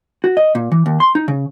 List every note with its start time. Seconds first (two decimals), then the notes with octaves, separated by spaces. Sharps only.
0.24 F#4
0.37 D#5
0.55 A#2
0.72 E3
0.86 D#2
1.00 C6
1.15 D#4
1.28 C#3